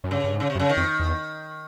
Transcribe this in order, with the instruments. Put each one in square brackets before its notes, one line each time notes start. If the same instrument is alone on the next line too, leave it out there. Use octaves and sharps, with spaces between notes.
[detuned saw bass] F#2
[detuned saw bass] G2 [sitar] C#3
[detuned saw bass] G2
G#2
[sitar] C#3
C3
[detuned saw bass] F#2
[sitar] C#3
D#3
[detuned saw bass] F2
E2